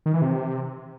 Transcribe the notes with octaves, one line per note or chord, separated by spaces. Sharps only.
D#3
E3
C3